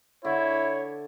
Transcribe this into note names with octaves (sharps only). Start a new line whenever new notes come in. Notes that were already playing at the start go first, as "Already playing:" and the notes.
D3 E4 C#5